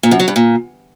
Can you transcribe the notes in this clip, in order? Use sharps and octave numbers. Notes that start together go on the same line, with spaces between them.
A#2
F#2
F#3
G2
A#2